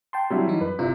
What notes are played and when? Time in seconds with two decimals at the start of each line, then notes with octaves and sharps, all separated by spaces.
0.13 G5 A5 C6
0.30 F#3 G3 E4
0.48 E3 D#4
0.61 F#2 B4
0.79 G1 C3 E4 F4